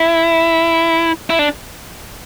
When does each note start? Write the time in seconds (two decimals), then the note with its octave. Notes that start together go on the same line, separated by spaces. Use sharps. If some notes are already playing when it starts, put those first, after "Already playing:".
Already playing: E4
1.30 E4
1.39 D4